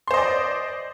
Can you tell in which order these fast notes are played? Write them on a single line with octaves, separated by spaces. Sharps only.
C6 C5 D#5 D5